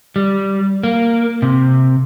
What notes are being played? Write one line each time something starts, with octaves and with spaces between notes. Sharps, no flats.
G3
A#3
C3